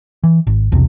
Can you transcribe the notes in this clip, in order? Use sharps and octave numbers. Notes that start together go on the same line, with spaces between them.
E3
G#1
B1 E2 C3